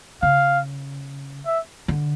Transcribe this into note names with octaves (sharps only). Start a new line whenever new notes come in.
C#3 F5
E5
D3